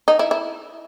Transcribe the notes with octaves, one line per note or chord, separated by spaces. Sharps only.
D#4
E4
E4